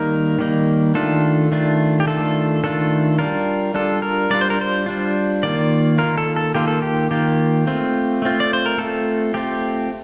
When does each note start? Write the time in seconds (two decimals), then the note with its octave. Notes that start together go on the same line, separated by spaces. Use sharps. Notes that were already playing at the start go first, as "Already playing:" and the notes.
Already playing: D#3 G3 A#3 D#4 A#4
0.39 D#3 G3 A#3 D#4
0.95 D#3 A3 D4 F4 A4
1.52 D#3 A3 D4 F4
2.00 G4
2.06 D#3 A3 D4 F4 A4
2.63 D#3 A3 D4 F4 A4
3.19 G3 D4 F4 A#4
3.74 G3 D4 F4 A4
4.02 A#4
4.30 G3 D4 F4 D5
4.41 C5
4.50 A#4
4.61 C5
4.86 G3 D4 F4
5.43 D#3 A#3 F4 D5
5.98 D#3 A#3 F4 A#4
6.18 A4
6.36 A4
6.54 D#3 A#3 F4 G4
6.68 A4
6.82 G4
7.11 D#3 A#3 F4 G4
7.67 A3 C4 F4
8.22 A3 C4 F4
8.40 D5
8.53 C5
8.66 A#4
8.78 A3 C4 F4 A4
9.34 A3 C4 F4 G4